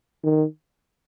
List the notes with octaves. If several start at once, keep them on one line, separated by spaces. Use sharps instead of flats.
D#3